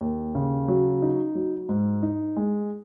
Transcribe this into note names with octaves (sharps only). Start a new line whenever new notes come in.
D#2
C#3
F#3
D#4
F#3
G#2
D#4
G#3